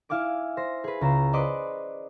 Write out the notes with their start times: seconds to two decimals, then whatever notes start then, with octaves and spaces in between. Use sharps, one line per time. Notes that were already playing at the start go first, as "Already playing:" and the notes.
0.09 E4 F5 G#5 D6 D7
0.57 C5 A#6
0.84 G#4 B4
1.01 C#2 A#5 E7
1.33 B4 C5 D5 D#5 D6 F#6